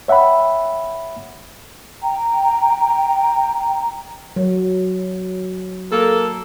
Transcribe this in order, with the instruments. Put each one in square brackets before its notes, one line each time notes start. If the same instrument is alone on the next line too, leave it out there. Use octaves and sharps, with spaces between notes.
[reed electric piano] C#5 E5 F#5 G5 B5
[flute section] G5 A#5
[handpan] F#3
[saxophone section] A#3 A4